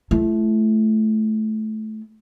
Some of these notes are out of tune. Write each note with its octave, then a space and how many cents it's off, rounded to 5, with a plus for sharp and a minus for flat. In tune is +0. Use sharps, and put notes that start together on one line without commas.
A3 -20 E4 +40